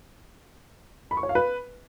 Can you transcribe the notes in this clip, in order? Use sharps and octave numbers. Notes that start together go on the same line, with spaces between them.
B5
C#6
C#5
F5
B4